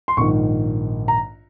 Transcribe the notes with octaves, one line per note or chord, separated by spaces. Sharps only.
C6
A#1 G#2 D#3 C#6
A#5